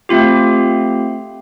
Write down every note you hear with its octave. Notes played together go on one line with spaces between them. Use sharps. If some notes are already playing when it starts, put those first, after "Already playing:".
A3 C4 F4 G4